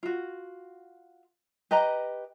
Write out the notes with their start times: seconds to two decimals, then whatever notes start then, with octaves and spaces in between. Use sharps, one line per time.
0.03 F4 F#4
1.71 G4 B4 D#5 A#5